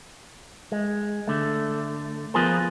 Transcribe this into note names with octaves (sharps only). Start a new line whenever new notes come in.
G#3
D3 A3
F3 B3 F4 G#4 A#4 C5